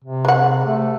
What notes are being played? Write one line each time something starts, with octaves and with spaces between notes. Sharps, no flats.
C3
G#3 F#5
A3